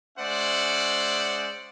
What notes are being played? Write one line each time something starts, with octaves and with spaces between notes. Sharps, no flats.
G#3 C#4 C5 D5 E5 F#5